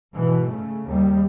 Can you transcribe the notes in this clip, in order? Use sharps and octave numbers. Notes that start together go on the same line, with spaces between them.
G#2 B2 E3
C#3 A3
D#2 G3